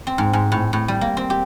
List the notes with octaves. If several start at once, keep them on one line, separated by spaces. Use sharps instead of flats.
C4
G#2
G#2
A2
A2
G3
A#3
C4
G4